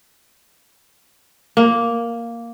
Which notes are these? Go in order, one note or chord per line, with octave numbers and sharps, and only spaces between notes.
A#3